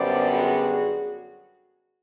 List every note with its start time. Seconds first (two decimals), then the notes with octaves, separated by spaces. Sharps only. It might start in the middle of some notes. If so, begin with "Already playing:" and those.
Already playing: F#2 D3 G3 B3 C5 D5
0.30 F#4 G#4